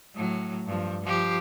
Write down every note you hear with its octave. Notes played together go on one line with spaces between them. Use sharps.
A2 F#3
G2 F3
F3 G4